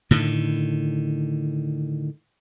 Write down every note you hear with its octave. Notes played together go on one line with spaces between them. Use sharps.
A2 D3 D#3